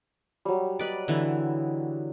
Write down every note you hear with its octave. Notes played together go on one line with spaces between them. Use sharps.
F#3 G3
B4 D5 D#5
D3 E3